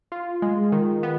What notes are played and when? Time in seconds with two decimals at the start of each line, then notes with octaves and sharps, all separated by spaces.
0.12 F4
0.42 G#3
0.72 D#3
1.03 B3